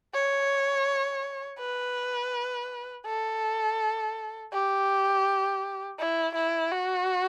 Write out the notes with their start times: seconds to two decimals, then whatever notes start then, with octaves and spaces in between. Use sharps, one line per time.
0.14 C#5
1.59 B4
3.06 A4
4.52 G4
5.99 E4
6.35 E4
6.71 F#4